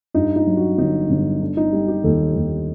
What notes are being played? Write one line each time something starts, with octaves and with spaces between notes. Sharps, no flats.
G2 D#4
D#4
F#3
F#4
G1 D#4
G1
D3 D4
D#4
G3
G4
D#2 A4
D#2